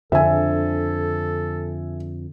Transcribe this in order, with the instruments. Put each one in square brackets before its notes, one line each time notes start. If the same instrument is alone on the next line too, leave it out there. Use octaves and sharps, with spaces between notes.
[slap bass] F2 [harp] D3 [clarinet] A4 [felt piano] E5 G#5